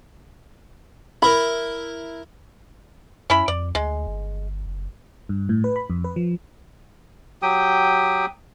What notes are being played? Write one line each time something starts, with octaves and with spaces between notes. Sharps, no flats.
E4 A#4 B5
F#2 C#4 E4 B5
F2 D5
D2 G#3
G1
F#1
G2
A2
B4
B5
F2
B4
F3
F#3 G4 G5 D#6